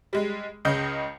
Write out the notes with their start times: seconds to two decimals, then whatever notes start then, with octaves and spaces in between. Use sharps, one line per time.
0.13 G3 G#3
0.65 C#2 C#3 D#5 G6